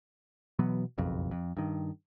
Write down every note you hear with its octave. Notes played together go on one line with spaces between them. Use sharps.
B2 E3 F#3 B3
F#1 B1 F2
F2
G2 D#3